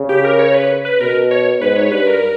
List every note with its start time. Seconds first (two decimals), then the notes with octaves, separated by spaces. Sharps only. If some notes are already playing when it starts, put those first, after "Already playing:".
Already playing: C#3
0.09 G4
0.25 A#4
0.39 C#5
0.54 B4
0.85 B4
1.00 B2 A#4
1.31 C#5
1.61 G#2 B4
1.76 C#5
1.91 G2 B4
2.07 A#4